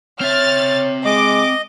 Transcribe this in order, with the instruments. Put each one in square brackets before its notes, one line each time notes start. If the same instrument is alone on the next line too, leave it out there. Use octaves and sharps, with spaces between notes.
[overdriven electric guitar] C4 E5 [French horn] C#5 [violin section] F6 A6
[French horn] G#3 [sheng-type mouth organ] D#5 [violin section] D6